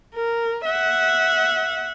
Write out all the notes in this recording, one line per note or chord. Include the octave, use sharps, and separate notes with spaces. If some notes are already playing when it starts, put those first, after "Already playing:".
A#4
E5 F#5